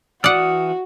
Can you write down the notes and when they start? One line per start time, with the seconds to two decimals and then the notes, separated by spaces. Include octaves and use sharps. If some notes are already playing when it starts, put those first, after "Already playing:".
0.24 E3 F#4 D5 F#5 D#6 F6